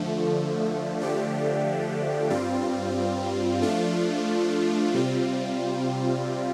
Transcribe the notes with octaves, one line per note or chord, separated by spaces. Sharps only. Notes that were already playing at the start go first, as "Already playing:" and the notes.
Already playing: D3 F3 A3
D3 F3 A3 D4 G4
G2 G3 C4 F4
F3 A3 D4 F4
C3 G3 C4 F4